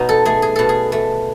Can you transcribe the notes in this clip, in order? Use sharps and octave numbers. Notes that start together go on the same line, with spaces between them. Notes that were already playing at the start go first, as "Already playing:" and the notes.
Already playing: B2 F#3 D#4
A4
A3 G#4
G#4
B2 A4
G#4
A3